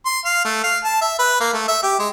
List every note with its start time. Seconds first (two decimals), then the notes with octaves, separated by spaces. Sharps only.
0.06 C6
0.25 F5
0.45 A3
0.64 F5
0.84 A5
1.01 E5
1.19 B4
1.40 A#3
1.54 A3
1.68 E5
1.83 G4
1.99 G#3